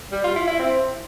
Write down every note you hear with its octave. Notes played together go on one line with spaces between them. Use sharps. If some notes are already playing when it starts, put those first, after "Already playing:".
G3
F4
E4
E4
C4